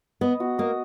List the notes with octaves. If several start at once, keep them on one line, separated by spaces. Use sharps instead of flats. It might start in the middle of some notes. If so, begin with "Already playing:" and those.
B3 D#5
F#4
A#3 D#5